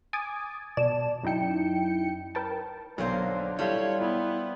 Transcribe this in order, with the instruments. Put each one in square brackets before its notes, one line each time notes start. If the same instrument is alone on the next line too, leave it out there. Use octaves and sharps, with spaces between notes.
[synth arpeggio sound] G#5 D6 D#6 A6
B2 D5 A5 E7
F#2 D#4 E4 G5 C#7
A#4 B4 G5 A5
[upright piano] B1 [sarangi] D3 [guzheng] F#3 A#3 C5
[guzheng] G3 F4 [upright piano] E4 A4 F5 [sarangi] C#5
[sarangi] B3 [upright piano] E4